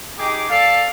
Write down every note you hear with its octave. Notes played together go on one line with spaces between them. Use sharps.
D#4 G4 G#4 D6
A4 D5 F5